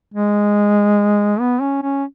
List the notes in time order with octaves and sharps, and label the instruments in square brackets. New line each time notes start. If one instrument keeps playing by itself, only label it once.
[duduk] G#3
B3
C#4
C#4